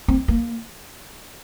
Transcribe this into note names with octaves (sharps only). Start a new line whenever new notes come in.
C4
A#3